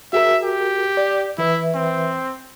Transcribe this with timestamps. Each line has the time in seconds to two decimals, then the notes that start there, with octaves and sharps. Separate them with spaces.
0.13 F#4 G#4 A#4 E5
0.43 G4
0.97 D5
1.38 E3 E4 B4 E5
1.75 C4